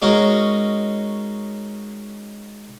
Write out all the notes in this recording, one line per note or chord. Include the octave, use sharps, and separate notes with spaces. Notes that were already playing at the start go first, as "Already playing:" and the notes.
G#3 C#4 D#4 F#4 A#4